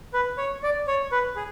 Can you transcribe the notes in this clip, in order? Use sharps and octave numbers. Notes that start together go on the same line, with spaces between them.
B4
C#5
D5
C#5
B4
G#4